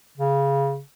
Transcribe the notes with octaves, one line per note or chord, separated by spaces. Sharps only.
C#3